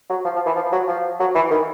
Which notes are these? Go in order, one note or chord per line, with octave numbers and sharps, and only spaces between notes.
F#3
F3
F3
E3
F3
F#3
F3
F#3
E3
D#3